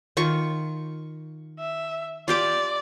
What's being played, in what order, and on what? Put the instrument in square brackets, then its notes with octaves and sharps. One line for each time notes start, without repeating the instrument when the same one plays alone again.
[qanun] D#3 F4 C#6
[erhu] E5
[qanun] F4 G4 D6 [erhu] D5